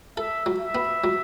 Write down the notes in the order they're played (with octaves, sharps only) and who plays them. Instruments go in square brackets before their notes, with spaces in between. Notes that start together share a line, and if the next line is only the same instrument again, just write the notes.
[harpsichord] A4 [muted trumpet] E5
[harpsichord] F#3
[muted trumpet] E5
[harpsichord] B3
F#3